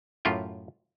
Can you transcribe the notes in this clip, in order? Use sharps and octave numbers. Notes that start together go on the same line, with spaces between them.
F#2 A2 F4 G4 G5